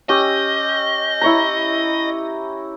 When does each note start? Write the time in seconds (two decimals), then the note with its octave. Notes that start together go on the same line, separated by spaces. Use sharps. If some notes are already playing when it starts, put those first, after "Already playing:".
0.09 C#4 G4 D#5 E6
1.21 E4 C#5 A#5